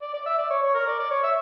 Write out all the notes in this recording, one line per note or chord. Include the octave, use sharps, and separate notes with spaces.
D5
D5
E5
D5
C#5
C#5
A#4
D5
D5
C#5
E5